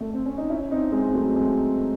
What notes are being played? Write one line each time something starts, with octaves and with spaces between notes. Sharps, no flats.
A3
C4
C#4
D#4
C#4 E4
C4 D#4
G#3 C4
F#3 A3
G#3 C4